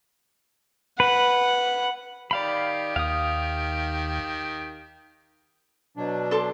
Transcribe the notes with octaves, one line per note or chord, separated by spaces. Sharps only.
B4 F#5
D#3 G4 D5 F5 B5
D#2 F5 D#6
B2 F#3 D4
A4 C6 D6